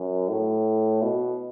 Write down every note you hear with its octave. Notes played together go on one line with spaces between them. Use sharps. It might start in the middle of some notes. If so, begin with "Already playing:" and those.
Already playing: F#2
A2
B2